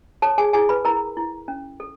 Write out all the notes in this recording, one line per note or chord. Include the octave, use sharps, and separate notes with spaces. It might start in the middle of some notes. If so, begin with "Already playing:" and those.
A4 C#5 A5
G#4 G#5
E4 G#4 G#5
B4 B5
E4 A#4 A#5
E4
C#4
A4